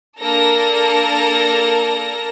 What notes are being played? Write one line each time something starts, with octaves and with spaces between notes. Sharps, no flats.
A#3 D4 A4 A#4 A#6